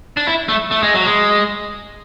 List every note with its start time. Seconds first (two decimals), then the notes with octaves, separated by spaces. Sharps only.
0.17 D4
0.27 E4
0.49 A3
0.71 A3
0.83 G#3
0.94 F#3
1.06 G#3